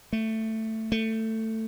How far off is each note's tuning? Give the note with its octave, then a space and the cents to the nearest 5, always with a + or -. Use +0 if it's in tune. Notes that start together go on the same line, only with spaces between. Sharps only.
A3 +10
A3 +15